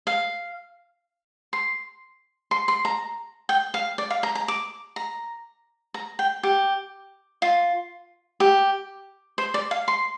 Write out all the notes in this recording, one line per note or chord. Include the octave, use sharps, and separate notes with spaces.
F5
C6
C6
C6
A#5
G5
F5
D5
F5
A#5
A#5
D6
A#5
A#5
G5
G4
F4
G4
C5
D5
F5
C6